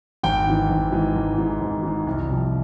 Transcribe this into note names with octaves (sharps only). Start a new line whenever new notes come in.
G#1 G5
G#2 E3
G#1
G#2 E3
G#1
G#2 E3
G#1
G#2 E3
C2
C3 F3